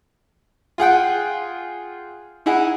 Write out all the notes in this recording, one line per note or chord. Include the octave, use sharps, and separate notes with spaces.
F4 G#4 F#5 G5
D#4 E4 G#4 F#5